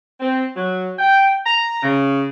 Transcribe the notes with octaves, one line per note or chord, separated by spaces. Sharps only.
C4
F#3
G5
A#5
C#3